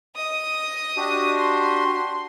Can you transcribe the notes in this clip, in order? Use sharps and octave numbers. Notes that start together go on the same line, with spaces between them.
D#5 D#6
D4 F#4 G4
C6